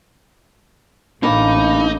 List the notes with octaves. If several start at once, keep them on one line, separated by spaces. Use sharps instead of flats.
A1 D3 A#3 D#4 F5 B5